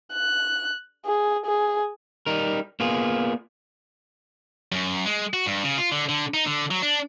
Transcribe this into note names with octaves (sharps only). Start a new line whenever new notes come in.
F#6
G#4
G#4
G3 D#4 A#4
A#3 B3 F4 G#4
F#2
G#3
F#4
G2
C#3
F4
D3
D3
D#4
D3
F#3
D4